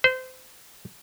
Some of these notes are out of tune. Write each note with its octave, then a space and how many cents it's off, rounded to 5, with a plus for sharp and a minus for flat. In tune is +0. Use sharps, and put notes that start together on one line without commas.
C5 -25